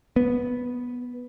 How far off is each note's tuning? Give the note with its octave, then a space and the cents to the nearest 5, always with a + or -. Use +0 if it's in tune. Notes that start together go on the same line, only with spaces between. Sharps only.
B3 -5